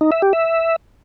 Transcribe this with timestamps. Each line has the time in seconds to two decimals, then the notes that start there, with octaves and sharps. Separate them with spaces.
0.01 D#4
0.12 E5
0.22 G4
0.33 E5